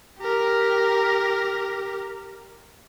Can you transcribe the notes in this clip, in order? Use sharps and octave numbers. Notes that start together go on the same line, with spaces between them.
G4 A#4